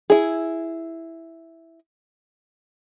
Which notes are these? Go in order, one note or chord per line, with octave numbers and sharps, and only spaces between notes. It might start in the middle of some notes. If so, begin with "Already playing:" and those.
E4 G#4